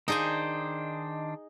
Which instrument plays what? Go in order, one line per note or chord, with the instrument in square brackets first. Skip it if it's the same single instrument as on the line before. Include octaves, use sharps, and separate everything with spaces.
[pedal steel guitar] D#3 D4 C5 [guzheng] D#4 G#4 G#5